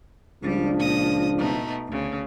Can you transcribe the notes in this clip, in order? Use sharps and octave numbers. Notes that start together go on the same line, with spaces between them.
C#2 F3 G3 D4
A#2 D#6 A#6
B2 A3 D#4
D2 C#3